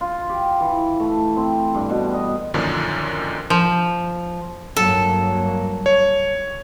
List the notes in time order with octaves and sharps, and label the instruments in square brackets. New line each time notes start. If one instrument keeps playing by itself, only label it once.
[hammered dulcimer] F4
G4
E3
A3
C4
G2
B2
D#5
[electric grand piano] F#2 A#2 D3 D#3 F3 D4
[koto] F3
[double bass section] G2 F#3 A#3 [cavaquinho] A4
[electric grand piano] C#5